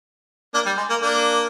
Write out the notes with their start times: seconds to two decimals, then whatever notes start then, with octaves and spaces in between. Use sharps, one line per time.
0.54 A#3 D4
0.66 G3
0.77 G#3
0.90 A#3
1.01 A#3 D4